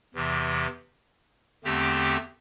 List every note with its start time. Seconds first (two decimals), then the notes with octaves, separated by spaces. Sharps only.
0.14 E2 C3 E3
1.64 E2 D3 A3 C4 G4